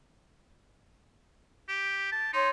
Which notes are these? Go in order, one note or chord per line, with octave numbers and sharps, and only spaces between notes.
G4
A5
D#4 C#5 C6